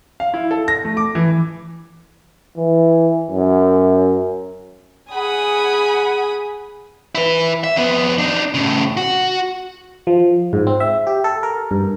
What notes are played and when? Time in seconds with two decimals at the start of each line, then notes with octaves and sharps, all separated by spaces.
0.20 F5
0.34 E4
0.51 A4
0.68 A#6
0.85 A3
0.97 D6
1.15 E3
2.57 E3
3.31 F#2
5.12 G#4 F#5 G#5 B5 D#6
7.15 E4 B4
7.64 E5
7.76 F2 B3
8.18 D4 D#4
8.54 A2 C#3
8.97 F#4
10.07 F3
10.53 G#2
10.67 C4
10.80 E5
11.07 G4
11.24 A4
11.43 A#4
11.71 G2